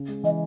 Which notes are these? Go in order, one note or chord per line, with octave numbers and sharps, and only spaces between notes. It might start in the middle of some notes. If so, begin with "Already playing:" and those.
Already playing: C#3
G#3
E3 D#5